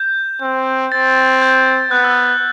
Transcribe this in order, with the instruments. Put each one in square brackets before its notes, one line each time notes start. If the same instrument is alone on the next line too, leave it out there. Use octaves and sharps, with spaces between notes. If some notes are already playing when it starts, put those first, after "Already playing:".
Already playing: [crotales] G6
[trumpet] C4
[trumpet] C4 [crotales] A6
[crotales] G6
[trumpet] B3 [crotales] F#6
[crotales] E6